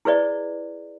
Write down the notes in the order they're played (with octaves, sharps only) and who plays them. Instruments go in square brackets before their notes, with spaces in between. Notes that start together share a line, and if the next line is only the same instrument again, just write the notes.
[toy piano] E4 G#4 B4 D5 D#5